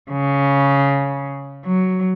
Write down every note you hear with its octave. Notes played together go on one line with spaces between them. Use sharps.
C#3
F#3